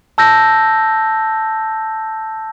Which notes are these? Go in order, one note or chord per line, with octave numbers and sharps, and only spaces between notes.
A5 E6 G6 A#6